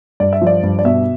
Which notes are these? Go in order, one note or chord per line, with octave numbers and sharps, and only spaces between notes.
G2 D5
E5
F3
D5
G2
D5
B2 E5